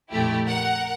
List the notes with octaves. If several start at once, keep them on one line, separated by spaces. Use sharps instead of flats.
A#1 F2 A3 E4 G4
A#4 F#5